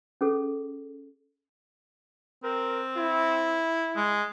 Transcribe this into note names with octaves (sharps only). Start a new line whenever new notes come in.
C#4 G#4 A4
C4 A#4
E4
G#3